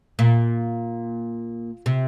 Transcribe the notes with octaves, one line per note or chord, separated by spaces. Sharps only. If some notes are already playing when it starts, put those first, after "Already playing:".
A#2
C3